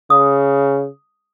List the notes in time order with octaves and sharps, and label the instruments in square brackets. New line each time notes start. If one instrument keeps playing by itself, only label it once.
[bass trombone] C#3 [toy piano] D#6